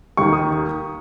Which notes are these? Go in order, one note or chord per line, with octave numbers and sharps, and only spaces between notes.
D#2 D#3 C#6
D#6